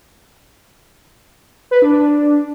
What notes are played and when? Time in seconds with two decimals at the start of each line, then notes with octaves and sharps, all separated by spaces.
1.71 B4
1.82 D4
1.92 D4